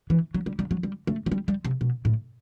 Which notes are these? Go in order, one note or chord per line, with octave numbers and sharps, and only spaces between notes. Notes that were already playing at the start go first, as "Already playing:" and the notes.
E3
F#3
G3
G3
F#3
G3
A3
F#3
G3
G3
C3
B2
A2